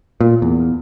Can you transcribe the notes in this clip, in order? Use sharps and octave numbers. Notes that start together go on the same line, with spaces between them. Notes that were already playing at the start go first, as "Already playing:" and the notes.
A#2
E2